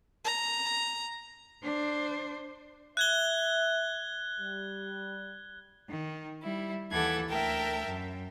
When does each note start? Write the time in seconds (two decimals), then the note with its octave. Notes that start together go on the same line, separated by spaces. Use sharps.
0.25 A#5
1.63 D4 C5
2.97 E5 F#6 G#6 G7
4.40 G3
5.90 D#3
6.42 G3 E4
6.91 D#2 E3 A4 F#5 D6 G#6
7.28 D2 A#4 E5 G5 A5
7.87 F#2